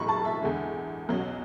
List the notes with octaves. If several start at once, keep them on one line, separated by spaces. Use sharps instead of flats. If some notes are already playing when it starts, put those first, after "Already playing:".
Already playing: B1 A2 E3 G#3 B5 C#6
A5
E5
E2 D3 G#3
B1 B2 F#3 C#4